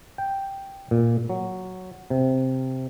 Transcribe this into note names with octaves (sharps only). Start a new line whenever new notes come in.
G5
A#2
F#3
C3